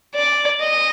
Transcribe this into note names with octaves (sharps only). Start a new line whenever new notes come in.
D5
D#5